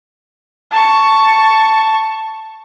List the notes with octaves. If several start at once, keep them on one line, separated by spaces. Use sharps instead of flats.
A5 C#6